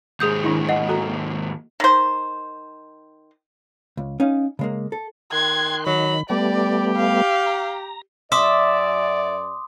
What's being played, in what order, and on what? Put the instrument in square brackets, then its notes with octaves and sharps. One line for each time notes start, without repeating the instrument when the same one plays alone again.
[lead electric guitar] D#2 G#2 [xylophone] G#4 D#6 G6
[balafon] D#3 D4 E4
[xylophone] D#5 F#5
[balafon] F#4 A4 A#5
A#3
[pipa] D#3 C5
[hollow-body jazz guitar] C#2
C#4 D#4 F5
C#3 G#3 A#3
A4
[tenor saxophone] D#3 [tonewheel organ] G5 C6 F#6 [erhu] G#6
[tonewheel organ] D#3 [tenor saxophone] F#3 [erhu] B5
[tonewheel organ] G3 A3 B3 [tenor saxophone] G4 [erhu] D5
[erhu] F5
[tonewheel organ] A#5
[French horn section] F#2 D5 [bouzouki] E5 [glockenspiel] C6 D6 D#6